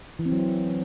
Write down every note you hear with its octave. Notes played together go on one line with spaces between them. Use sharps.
E3
C4
F#3